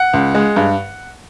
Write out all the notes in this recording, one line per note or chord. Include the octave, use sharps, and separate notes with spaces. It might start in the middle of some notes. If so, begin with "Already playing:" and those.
Already playing: F#5
C#2
G#3
G2